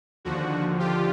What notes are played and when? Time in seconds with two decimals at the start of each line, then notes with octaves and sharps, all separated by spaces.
0.25 D#2 D3 F3 F#4
0.79 F4 G4